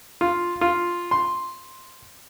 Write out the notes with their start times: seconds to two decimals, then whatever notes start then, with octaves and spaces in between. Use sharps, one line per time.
0.21 F4
0.61 F4
1.11 C6